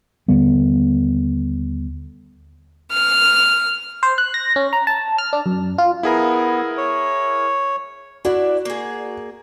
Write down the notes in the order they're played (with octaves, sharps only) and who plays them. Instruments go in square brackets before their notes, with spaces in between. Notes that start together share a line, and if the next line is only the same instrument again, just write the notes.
[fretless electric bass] D#2 D3 G3 B3
[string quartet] F6
[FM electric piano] C5
F#6
A#6
C#4
A#5
A5
F6
D4
F#2
F4
[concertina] B3 [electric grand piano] E4 G#4 A#4
[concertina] C#5
[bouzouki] D4 E4 D5 [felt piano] F#4
[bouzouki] A#3 G#4